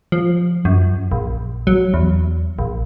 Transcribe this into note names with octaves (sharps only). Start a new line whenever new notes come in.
F3
F#2
A#1
F#3
E2
A#1